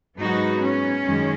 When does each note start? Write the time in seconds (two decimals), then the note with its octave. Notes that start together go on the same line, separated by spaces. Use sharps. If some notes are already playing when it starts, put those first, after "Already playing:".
0.18 G#2 F#3 B3 D#4 F#4
0.61 C#4
1.05 F#2 D#3 G#3